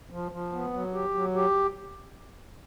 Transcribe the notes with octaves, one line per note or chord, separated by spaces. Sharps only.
F3
F3
B3
F#3
G4
F#3
G4